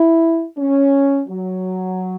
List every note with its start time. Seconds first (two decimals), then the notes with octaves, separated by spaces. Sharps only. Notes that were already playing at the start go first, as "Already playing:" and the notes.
Already playing: E4
0.58 C#4
1.28 F#3